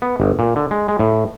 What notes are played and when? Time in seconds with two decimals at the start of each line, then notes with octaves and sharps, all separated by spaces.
0.02 B3
0.20 G1
0.39 A#2
0.56 D3
0.71 G#3
0.88 G#3
0.99 A2